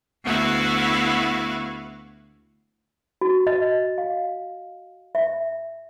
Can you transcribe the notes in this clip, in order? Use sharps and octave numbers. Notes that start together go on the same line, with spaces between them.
D2 B3 E4 F#4 F5
F#4
D#5
F5
E5